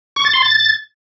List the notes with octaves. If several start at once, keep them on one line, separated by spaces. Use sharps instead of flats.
C#6
A6
C6
A6